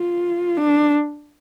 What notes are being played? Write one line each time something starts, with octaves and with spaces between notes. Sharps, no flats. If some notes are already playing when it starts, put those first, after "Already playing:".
Already playing: F4
D4